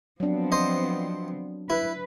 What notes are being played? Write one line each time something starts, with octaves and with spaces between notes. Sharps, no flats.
F3 F#3 B3 C4 D4
C5 D#5
E4 B4